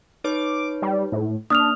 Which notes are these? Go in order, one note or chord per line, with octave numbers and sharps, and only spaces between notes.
D#4 B4 C#5 D6
G3
A2
A#3 D4 D#6 F6 F7